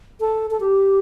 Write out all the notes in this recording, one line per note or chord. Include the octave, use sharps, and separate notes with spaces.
A4
A4
G4